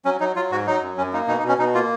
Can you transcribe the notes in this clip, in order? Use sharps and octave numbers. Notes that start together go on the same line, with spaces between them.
F#3 C#4
F#3 D#4
F#3 F4
G#2 F#4
F#3 D#4
F#2
F#2 C#4
A#3 D#4
B2 D#4
D#4
B2 C#4
B2 D#4
A#3 F4